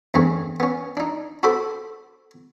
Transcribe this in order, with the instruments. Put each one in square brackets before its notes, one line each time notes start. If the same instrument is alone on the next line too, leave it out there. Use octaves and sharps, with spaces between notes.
[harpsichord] E2 G2 A3 C4 C#4
B3 C#4
D4 D#4
F#4 A4 C5 B5 D6 D#6